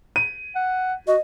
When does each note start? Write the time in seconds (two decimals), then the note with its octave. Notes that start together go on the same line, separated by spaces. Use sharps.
0.16 D#7
0.55 F#5
1.07 F#4 D#5